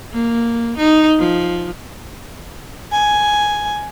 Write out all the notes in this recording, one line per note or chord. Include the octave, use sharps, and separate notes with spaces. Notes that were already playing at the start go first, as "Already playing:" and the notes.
A#3
D#4
F3
G#5